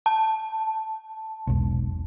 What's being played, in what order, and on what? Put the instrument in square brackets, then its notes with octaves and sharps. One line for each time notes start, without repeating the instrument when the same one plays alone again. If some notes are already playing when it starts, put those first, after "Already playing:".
[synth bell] A5
[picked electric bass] E1 B1